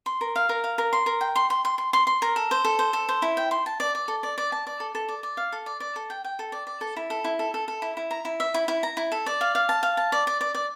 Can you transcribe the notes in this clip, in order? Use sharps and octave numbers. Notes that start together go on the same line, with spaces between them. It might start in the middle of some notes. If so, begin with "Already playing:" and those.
C6
A#4
F5
A#4
F5
A#4
C6
A#4
G5
C6
C6
C6
C6
C6
C6
A#4
A4
C5
A4
C5
A4
C5
E4
G5
C6
A5
D5
D5
A4
D5
D5
A5
D5
A4
A4
D5
D5
F5
A4
D5
D5
A4
G5
G5
A4
D5
D5
A4
E4
A4
E4
A4
A4
A4
E4
E4
A#5
E4
E5
E4
E4
A#5
E4
A4
D5
F5
F5
A5
F5
A5
D5
D5
D5
D5